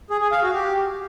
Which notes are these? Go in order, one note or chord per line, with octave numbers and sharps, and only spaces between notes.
G#4
G#4
F5
F#4
G4